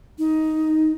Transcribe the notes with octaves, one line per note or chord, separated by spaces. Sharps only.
D#4